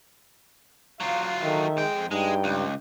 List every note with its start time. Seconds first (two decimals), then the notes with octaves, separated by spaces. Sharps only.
1.00 F#3 F4 F5
1.43 D#3 A4 E5
1.77 F2 G#3 G5
2.11 G2 G#3 D#4 G5
2.44 C#2